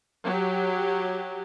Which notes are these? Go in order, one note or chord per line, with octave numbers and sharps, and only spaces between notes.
F#3 G4